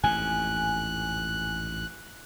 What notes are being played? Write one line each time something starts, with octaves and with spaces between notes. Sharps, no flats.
A1 F2 G#2 G#5 F#6